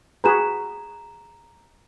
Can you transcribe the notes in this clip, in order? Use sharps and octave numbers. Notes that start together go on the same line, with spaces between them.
F#4 G#4 B4 A#5 E7